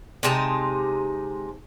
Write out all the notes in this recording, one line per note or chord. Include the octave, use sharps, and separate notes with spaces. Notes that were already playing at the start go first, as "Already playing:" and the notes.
C3 G#3 D#4 A5